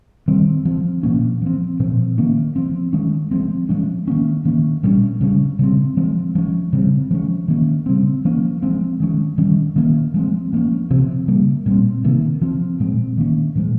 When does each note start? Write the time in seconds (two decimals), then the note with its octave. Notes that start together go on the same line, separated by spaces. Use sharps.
0.28 D#3 G3 C4
0.65 F3 C4
1.03 A#2 F3 A#3 C#4
1.42 F3 C4
1.80 A#2 F3 C4
2.18 D#3 A#3 C#4
2.56 F3 C4
2.93 D#3 G#3 C#4
3.31 F3 G#3 C4
3.69 F3 G#3 C#4
4.08 D#3 A#3 C#4
4.45 D#3 A#3 C#4
4.83 A#2 G3 A#3 C#4
5.21 C#3 G3 C#4
5.59 C#3 G3 C4
5.97 F3 G#3 C4
6.35 F3 G#3 C#4
6.73 C#3 G3 C4
7.11 F3 G#3 C#4
7.48 D#3 A#3 C#4
7.86 C#3 G3 C4
8.25 F3 A#3 C#4
8.62 F3 G#3 C4
9.00 D#3 G#3 C#4
9.38 D#3 G3 C#4
9.76 D#3 A#3 C#4
10.14 F3 G#3 C4
10.53 F3 A#3 C#4
10.90 C3 F3 C4
11.28 C#3 G3 A#3
11.66 A#2 G3 C4
12.04 C3 D#3 A#3
12.42 F3 C4
12.80 A#2 G#3 C4
13.18 D#3 A#3 C#4
13.55 A#2 F3 G#3